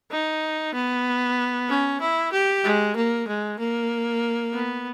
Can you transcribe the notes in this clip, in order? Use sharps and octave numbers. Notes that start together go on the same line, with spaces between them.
D#4
B3
C#4
E4
G4
G#3
A#3
G#3
A#3
B3